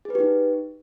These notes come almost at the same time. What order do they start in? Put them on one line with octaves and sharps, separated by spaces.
G#4 B4 G4 D#4